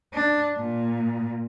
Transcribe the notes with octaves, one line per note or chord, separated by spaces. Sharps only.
D4
A#2